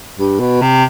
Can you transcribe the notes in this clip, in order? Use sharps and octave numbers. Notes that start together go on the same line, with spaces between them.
G2
B2
C3